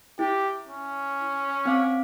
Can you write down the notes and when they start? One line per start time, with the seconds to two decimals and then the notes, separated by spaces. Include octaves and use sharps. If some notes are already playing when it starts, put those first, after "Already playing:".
0.19 E4 G4
0.68 C#4
1.66 C4 F5 D6